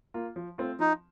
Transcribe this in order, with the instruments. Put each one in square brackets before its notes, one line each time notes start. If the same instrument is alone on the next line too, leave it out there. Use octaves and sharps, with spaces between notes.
[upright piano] A#3 F4
F3
A3 C4 F4
[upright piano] F3 [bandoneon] D#4